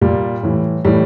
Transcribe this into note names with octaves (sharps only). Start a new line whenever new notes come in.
A#2 G3
A2 E3
A2 E3 G3